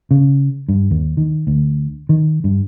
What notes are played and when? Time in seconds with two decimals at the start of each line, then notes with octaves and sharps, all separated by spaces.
0.11 C#3
0.69 G2
0.91 D#2
1.17 D#3
1.47 D2
2.09 D#3
2.44 G2